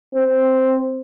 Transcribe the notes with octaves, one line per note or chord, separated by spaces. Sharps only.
C4